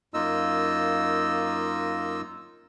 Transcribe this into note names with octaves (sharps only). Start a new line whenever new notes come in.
F#2 A#3 D#4 F4 D#5 E6